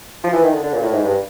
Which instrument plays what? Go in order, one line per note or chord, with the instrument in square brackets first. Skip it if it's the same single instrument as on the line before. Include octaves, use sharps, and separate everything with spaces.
[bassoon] F3
E3
D#3
D3
D3
A#2
A2
G#2
G2